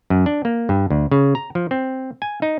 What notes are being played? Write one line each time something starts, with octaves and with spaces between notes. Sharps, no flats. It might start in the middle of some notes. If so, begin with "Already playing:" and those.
F#2
D4
A#3
G2
D2
C#3
A#5
F3
C4
G#5
D#4